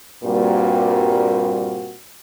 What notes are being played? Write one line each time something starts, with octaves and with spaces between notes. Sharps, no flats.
G2 A#2 G3 A#3 C4 F#4